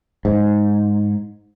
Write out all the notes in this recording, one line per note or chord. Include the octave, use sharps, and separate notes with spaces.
G#2